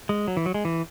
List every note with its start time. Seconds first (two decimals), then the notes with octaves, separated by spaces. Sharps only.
0.09 G#3
0.28 F#3
0.37 E3
0.46 F#3
0.54 G#3
0.65 E3